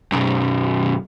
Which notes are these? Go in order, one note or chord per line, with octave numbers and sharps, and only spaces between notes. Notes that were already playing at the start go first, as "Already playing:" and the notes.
B1 F#2